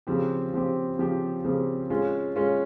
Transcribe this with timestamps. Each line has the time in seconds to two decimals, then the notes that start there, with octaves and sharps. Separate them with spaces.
0.07 C#3 F3 C4 G4
0.53 C#3 F3 C4 G4
0.99 C#3 F3 C4 G4
1.44 C#3 F3 C4 G4
1.90 G#3 C#4 F4
2.36 G#3 C#4 F4